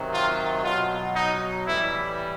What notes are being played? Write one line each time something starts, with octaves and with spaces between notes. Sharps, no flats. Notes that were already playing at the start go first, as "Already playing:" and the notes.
Already playing: C3 D#3 F#3
F4
B2 F#3 F4
D#4
A2 E3 G3 E4